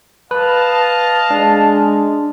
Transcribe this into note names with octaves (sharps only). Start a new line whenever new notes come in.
B4 D#5 F5 A5
G#3 D4